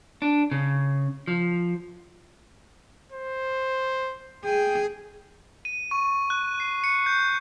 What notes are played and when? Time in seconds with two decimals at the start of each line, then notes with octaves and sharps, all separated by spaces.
0.22 D4
0.51 C#3
1.28 F3
3.12 C5
4.45 G#4 G5
5.65 D#7
5.91 C#6
6.30 F#6
6.60 C7
6.84 C#7
7.06 G6